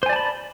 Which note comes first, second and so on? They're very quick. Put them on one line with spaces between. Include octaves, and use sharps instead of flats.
C5 G#5 D5 A5 B5